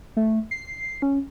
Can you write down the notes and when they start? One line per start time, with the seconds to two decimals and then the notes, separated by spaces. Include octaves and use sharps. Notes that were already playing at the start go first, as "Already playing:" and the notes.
0.17 A3
0.51 C7
1.02 C#4